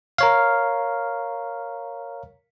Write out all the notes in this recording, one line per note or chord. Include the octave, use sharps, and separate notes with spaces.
A#4 C#5 F5